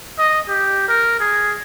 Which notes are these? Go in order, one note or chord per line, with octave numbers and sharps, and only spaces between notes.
D#5
G4
A#4
G#4